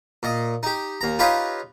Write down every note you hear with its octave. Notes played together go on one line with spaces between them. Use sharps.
A#2 D#5
D#4 G4
D#2 A#5
D#4 F4 G4 B4 C#5 D#5